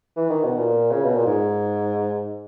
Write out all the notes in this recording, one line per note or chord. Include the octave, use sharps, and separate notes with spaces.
E3
D#3
B2
A#2
C#3
B2
A#2
G#2